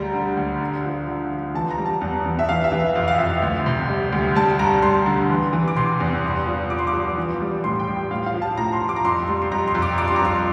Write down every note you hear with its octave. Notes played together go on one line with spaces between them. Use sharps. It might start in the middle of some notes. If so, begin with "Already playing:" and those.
Already playing: D2 G3 A#5
D3
D2
D3
F3
D3
F3
E3 A5
A#5
G3
A5
E2
E2
E5
E3 F5
E5
E3
E5
F2 F5
F5
F2 E5
D2
C3
G3
D2
G3 A5
G2 A#5
G3 C6
D3
E3
E3
D6
C3 C6
E2
G2
F3
G2 D6
C6
D6
F3
E3
G3
A2 C6
G5
G3
A2 F5
F5
F3
A5
A2 A#5
C6
F3
D6
A#5
F2 C6
G3 C6
C6
F2 A#5
C6
F2
D6
G2 D6
C6
A#5
F3 C6